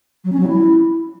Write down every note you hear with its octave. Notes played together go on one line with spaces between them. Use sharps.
F#3
C#4
F#3
E4